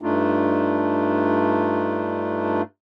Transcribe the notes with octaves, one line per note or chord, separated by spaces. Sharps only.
G2 A3 D4 D#4 F4